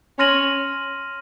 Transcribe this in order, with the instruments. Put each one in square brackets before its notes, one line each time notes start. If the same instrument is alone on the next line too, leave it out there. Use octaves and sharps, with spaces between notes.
[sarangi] C#4 [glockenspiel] C6 F6 A#6 D#7 F#7